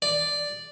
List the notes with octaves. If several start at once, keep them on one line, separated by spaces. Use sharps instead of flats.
D5